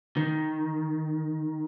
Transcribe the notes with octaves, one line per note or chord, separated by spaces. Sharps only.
D#3